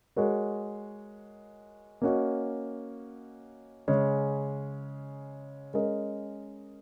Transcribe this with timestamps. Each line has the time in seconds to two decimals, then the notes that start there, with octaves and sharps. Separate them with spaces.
0.16 G#3 F#4 A#4 C#5
2.02 A#3 C#4 F#4 D#5
3.88 C#3 G#3 C#4
5.74 G#3 C#4 A#4 D#5